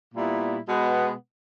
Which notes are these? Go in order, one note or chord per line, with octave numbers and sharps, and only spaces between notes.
A#2 G3 B3 E4
B2 G#3 B3